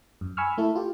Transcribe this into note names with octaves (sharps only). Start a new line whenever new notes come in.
F#2
G#5 B5 C#6 E6 F6
A3 E4 A4
F4 G4